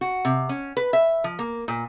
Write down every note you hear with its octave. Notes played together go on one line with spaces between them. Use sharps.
F#4
C3
C#4
B4
E5
F3
A#3
A#2